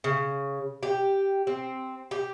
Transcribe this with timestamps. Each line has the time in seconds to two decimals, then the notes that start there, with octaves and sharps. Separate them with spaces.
0.04 C#3
0.83 G4
1.47 C4
2.11 G4